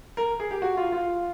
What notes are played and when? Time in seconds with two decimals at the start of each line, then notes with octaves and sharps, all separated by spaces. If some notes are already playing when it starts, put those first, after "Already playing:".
0.17 A#4
0.40 G#4
0.51 G4
0.62 F#4
0.77 F4
0.92 F4